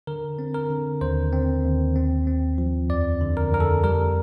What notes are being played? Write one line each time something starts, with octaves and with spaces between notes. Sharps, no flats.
D3 A#4
C4
A#4
D3
D#2 C5
C4
D#2
C4
C4
F3
F2 D5
D3
A#4
F2 A#4
A4
G3 A#4